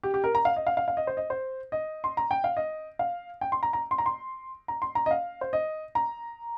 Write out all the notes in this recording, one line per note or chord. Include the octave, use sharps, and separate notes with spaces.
G4
G4
A#4
A#5
F5
D#5
F5
F5
F5
D#5
C5
D#5
C5
D#5
C6
A#5
G5
F5
D#5
F5
G5
C6
A#5
A#5
C6
A#5
C6
A#5
C6
A#5
D#5
F5
C5
D#5
A#5